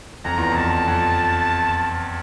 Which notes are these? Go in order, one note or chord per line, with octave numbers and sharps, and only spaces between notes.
F2 A#5
E2
F2 A5
F2